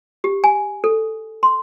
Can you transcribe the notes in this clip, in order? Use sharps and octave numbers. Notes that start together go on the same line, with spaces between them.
G4
G#5
A4
C6